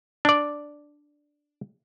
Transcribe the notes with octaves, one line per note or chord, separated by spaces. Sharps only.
D4 D5